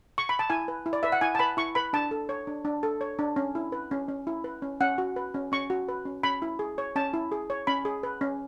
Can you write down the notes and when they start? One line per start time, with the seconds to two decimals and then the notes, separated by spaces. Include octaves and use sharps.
0.18 C#6
0.29 B5
0.39 A5
0.50 E4 G#5
0.68 B4
0.86 E4
0.93 D5
1.03 B4 E5
1.12 F#5
1.21 E4 G#5
1.35 A5
1.39 B4 B5
1.57 E4 C#6
1.75 B4 B5
1.93 D4 A5
2.11 A4
2.29 C#5
2.47 D4
2.65 D4
2.83 A4
3.01 C#5
3.19 D4
3.36 C#4
3.55 E4
3.72 B4
3.91 C#4
4.08 C#4
4.27 E4
4.44 B4
4.62 C#4
4.80 C#4 F#5
4.98 F#4
5.16 B4
5.34 C#4
5.52 C#4 C#6
5.70 F#4
5.89 B4
6.05 C#4
6.23 C#4 B5
6.42 E4
6.59 G#4
6.78 C#5
6.96 C#4 A5
7.14 E4
7.32 G#4
7.50 C#5
7.67 C#4 B5
7.85 G#4
8.03 B4
8.21 C#4